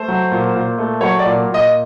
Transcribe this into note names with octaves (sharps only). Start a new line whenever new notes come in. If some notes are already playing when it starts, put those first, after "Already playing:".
Already playing: A3 C5
F#3
A#2
A#2
A3
F#3 C#5
D5
A#2
A#2
D#5